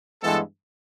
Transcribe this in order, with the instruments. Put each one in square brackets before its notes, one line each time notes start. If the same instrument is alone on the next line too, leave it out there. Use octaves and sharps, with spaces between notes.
[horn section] G2 E3 G#3 B3 A4